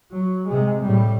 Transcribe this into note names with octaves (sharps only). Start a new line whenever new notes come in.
F#3
C3 G#3
A2 G3